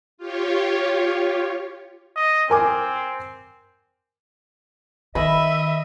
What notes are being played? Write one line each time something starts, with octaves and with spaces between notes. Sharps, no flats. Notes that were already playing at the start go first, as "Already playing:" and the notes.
F4 G4 C#5
D#5
C4 A#4 G#5 D6
D#3 D#5 E5 B5